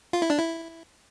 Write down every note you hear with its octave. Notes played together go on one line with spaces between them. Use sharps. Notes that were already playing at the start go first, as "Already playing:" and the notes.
F4
E4
D4
E4